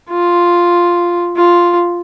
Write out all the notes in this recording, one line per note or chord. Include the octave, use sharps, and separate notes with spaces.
F4
F4